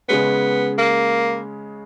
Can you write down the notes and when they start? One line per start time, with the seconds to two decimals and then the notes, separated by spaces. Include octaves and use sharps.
0.08 C#3 G#3 B3 C#4
0.78 A#3